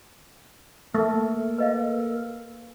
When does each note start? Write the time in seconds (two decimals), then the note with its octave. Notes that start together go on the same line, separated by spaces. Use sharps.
0.95 A3 A#3 A4 A#4
1.58 B4 D#5 F5